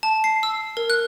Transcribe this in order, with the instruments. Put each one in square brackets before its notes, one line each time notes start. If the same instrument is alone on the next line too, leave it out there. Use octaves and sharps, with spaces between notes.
[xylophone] A5
C7
E6
A#4
F#6